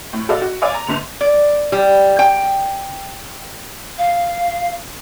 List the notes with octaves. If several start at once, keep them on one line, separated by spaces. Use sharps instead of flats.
A2
F#4 A4 D5 D#5 F5
F#4
C#5 D5 F5 G#5 D6
A#5
G1 D3 F7
D5
G3
G5
F5